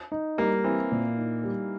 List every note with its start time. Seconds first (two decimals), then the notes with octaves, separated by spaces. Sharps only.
0.12 D#4
0.38 G3 A#3
0.64 E3 C4
0.92 A#2
1.18 D#4
1.44 G3